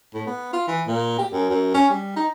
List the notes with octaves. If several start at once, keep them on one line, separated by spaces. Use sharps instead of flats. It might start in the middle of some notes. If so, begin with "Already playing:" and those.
A2
B3
F4
E3
A#2
G4
F#2
F#2
C#4
G3
D#4